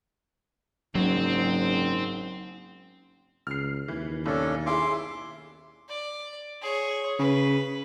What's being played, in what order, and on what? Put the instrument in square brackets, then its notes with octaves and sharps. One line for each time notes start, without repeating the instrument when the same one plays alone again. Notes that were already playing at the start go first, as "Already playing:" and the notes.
[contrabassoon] F#1 [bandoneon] G#2 [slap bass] F#3 [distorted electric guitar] C4
[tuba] C#2 [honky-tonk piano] F6 C7
[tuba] D#2 [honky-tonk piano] E3
[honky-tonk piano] B1 [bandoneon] C#4 D4 A4
[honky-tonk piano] E4 G#4 E5 [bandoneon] C6 D6
[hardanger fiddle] D5
G#4 C#5
[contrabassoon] C#3 [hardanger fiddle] B4